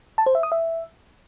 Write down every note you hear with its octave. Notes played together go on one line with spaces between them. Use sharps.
A5
C5
E5
D#6
E5